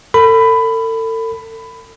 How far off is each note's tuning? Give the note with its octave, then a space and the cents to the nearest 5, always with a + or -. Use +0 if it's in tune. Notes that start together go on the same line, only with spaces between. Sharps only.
A4 +40 B5 +15